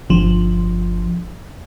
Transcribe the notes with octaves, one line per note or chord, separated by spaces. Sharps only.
G1 F3